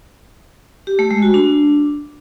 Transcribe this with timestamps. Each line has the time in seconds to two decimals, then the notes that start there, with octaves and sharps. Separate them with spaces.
0.87 G4
0.99 A3
1.11 G#3
1.22 F#4
1.34 D4